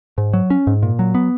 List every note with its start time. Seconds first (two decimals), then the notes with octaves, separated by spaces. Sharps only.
0.18 G#2
0.33 F#3
0.50 C#4
0.67 G#2
0.83 A#2
0.99 F#3
1.15 B3